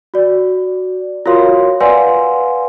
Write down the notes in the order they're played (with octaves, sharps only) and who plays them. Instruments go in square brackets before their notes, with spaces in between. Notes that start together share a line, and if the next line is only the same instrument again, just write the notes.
[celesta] F#4 D5
F4 F#4 A#4 C#5 F5 C6
B4 D5 F5 F#5 G#5 C6